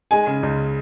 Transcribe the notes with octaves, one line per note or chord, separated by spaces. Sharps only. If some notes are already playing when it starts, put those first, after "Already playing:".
G#3 G#5
C#3
C#2